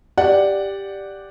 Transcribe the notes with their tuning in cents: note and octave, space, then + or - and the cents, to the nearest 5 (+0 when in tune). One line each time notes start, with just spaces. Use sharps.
G4 +5 D5 +0 F#5 +0